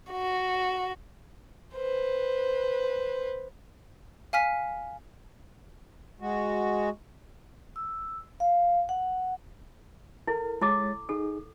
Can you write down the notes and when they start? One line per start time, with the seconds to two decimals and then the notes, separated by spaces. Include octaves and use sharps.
0.11 F#4
1.75 B4 C5
4.33 F5 G#5 F6 B6
6.20 G#3 F#4
7.76 E6
8.40 F5
8.89 F#5
10.27 E4 A4 A#4
10.61 G#3 E4 A4 C#5 D6 A6
11.09 D#4 G#4 A4